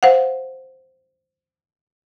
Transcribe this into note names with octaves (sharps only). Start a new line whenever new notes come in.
C5 F5 F#5